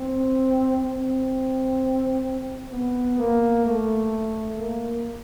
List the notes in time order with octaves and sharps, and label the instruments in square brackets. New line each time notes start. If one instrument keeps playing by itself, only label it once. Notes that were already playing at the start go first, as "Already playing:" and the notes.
Already playing: [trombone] C4
C4
B3
A#3
A3
A#3